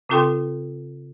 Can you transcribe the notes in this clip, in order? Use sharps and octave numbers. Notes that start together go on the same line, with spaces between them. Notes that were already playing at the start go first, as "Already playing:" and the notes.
C#3 C4 F4 A4 G5 C6